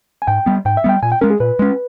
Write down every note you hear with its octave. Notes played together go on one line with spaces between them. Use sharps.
G#5
G#2 G5
G3 B3
G#2 G5
E5
G3 B3 G5
A#2 G#5
G5
G#3 C#4 A#4
G#4
A#2 B4
G#3 C#4